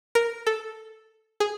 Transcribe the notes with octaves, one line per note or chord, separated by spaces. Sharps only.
A#4
A4
G#4